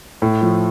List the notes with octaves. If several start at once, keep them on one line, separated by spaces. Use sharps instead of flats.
A2
F3 A3